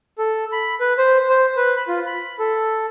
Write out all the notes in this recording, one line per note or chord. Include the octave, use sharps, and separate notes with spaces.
A4
B5
B4
C5
C5
B4
B5
F4
B5
A4